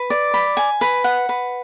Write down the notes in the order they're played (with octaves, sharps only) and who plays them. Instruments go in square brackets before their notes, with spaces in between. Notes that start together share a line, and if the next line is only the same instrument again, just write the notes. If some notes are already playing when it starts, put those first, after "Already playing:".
Already playing: [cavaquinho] B4
D5
B5
G#5
B4
F#5
B4